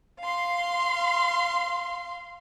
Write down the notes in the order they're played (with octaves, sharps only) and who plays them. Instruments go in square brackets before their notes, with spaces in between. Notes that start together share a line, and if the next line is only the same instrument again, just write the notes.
[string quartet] F5 C6